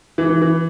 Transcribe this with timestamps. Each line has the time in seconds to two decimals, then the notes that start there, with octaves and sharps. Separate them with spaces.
0.18 E3
0.30 E3
0.42 E3